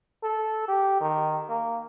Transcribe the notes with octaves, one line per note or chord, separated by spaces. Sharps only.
A4
G4
D#3
A#3